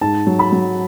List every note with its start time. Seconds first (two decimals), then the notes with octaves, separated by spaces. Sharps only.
0.01 G#2 A5
0.27 F#3
0.39 B5
0.52 F#3